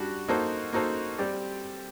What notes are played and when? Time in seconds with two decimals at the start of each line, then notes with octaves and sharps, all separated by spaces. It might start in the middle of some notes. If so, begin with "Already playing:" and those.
Already playing: G3 D4 F#4
0.28 A#3 D#4 F#4 A4 C5
0.73 A#3 D#4 F#4 A4 C5
1.18 G3 C4 G4 D5